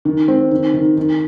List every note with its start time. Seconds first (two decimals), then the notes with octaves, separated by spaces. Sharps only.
0.05 D#3
0.28 C4
0.51 D#3
0.74 D#3
0.97 D#3